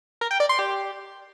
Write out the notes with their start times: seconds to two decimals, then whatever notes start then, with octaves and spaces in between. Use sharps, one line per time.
0.21 A#4
0.31 G5
0.40 D5
0.49 C6
0.59 G4